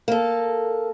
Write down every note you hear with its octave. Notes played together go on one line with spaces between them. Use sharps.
A#3 A4